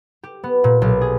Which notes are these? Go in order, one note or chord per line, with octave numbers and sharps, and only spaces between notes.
G4
B3
A#2
B1
G#4